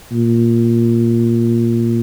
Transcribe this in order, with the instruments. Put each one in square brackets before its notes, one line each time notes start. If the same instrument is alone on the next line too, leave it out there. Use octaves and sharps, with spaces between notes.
[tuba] A#2